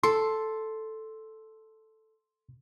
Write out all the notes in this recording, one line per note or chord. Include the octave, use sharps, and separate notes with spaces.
A4 C6